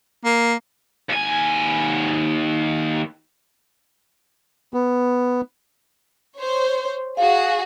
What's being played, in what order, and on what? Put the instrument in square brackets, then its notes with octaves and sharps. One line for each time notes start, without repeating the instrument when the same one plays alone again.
[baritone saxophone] A#3
[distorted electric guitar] D#2 G#5
[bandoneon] B3
[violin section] C5 C#5
[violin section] F#4 G#4 [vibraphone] F5